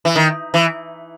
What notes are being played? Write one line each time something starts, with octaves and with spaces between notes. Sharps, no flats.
E3
D#3
E3